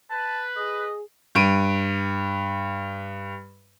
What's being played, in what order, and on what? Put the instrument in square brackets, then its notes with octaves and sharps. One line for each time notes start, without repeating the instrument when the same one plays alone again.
[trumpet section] B4 [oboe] A5
[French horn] G#4 [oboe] D#5
[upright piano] G2 D7 D#7